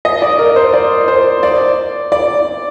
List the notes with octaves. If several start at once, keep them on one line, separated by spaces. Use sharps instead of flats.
D#5
D5
A#4
C5
D5
C5
D5
D5